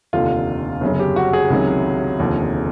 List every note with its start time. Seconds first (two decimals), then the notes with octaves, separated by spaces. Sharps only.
0.13 F1 D#2 D3 F4
0.81 G1 F#2 C#3
0.99 G4
1.16 F#4
1.33 G#4
1.50 C#2 C3 D#3 F#3
2.19 F1 D#2 D3 F3